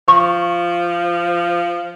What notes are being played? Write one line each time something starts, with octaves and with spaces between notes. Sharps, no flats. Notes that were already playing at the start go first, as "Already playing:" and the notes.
F3 C#6